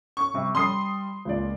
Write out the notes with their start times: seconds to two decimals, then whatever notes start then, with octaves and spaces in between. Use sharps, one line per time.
0.17 C#6
0.34 C3 G3
0.55 G3 C6 D#6 C7
1.25 C#2 A#2 D5